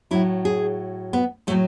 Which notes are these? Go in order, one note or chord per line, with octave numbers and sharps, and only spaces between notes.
A2 F#3 E4
G#4
B3
A2 F#3 A3